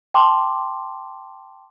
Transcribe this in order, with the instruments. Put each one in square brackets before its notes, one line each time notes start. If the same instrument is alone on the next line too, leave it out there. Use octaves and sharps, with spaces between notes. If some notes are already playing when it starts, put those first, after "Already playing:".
[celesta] G5 A5 C6 D6